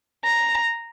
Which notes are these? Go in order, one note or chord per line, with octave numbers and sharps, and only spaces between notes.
A#5